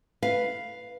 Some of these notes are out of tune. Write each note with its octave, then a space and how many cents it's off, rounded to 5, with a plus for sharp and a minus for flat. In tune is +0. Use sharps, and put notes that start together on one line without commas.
B4 +0 F5 +0